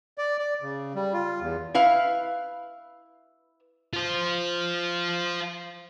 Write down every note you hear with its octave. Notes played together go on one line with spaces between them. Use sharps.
D5
D5
C#3
G3
F4
E2
E4 B4 F5
F4 C5